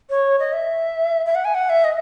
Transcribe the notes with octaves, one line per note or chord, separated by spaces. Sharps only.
C#5
D#5
E5
E5
F#5
G#5
F#5
E5
D#5